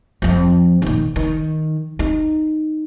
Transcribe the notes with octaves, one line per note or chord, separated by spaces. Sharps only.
F2 F3
A#2 D#3
D#3
D#4